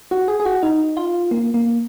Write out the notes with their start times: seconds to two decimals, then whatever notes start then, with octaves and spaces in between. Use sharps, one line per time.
0.11 F#4
0.28 G#4
0.40 G#4
0.45 F#4
0.63 D#4
0.97 F4
1.31 A#3
1.54 A#3